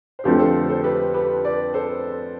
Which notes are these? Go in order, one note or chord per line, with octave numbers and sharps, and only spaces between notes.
C5
F2 D3 F3 A3 C4 G4 B4
A4 C5
A4 C5
G4 B4
G4 B4
B4 D5
A4 C5